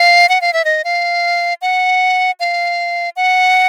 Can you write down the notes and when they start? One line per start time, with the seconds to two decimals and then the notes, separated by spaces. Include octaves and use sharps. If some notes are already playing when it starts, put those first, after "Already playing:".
Already playing: F5
0.29 F#5
0.41 F5
0.53 E5
0.65 D#5
0.84 F5
1.62 F#5
2.40 F5
3.16 F#5